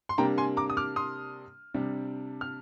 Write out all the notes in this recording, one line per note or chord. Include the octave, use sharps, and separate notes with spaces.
C6
C3 G3 A#3 D4 G5 A#5
G#5 C6
A#5 D6
D#6
D6 F6
C6 D#6
C3 G3 D4
F6